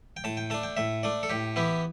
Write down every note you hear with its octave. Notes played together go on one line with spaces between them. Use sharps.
G5
A2 A5
G5
A3 D4 A5
G5
A2 E5
A3 D4 D5
A4
A2 G4
E3 B3 E4 G4